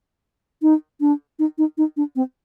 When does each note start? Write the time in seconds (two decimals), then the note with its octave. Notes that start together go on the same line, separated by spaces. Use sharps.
0.62 D#4
1.01 D4
1.39 D#4
1.58 D#4
1.78 D#4
1.97 D4
2.16 C4